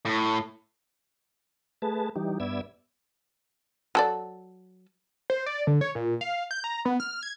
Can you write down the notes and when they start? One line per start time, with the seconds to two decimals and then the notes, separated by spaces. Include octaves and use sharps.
0.05 A2
1.82 A3 G#4 B4 A5
2.16 E3 G3 D#4 G4
2.40 G2 B3 D5 E5 E6 G#6
3.95 F#3 A4 D5
5.30 C5
5.46 D5
5.67 D3
5.81 C#5
5.95 A#2
6.21 F5
6.51 G6
6.64 A#5
6.85 B3
7.00 F6
7.23 G#6